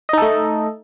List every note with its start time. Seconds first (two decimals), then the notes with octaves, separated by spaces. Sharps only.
0.09 D#5
0.13 D#4
0.18 A4
0.22 A3